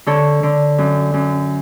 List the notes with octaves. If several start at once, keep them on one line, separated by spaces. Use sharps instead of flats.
D3 A4 C#5
D3
F#2
F#2